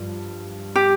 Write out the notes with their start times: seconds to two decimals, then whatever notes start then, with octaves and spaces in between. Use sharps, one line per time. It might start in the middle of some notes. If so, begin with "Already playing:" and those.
Already playing: G2 F3
0.76 G4